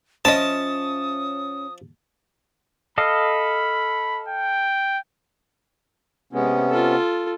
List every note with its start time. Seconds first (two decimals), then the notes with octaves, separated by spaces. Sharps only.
0.25 F3 C#4 C#5 D#5 E5 A5 D#6
2.98 A4 D#5 F5 B5
4.29 G5
6.33 C3 G#3 B3 C#4
6.70 F4 A4